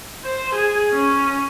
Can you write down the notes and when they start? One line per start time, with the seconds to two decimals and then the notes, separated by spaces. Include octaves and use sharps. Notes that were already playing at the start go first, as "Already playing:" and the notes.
0.25 C5
0.55 G#4
0.92 C#4